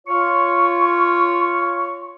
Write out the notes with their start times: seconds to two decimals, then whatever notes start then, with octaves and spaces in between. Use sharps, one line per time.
0.07 F4 C#5 C#6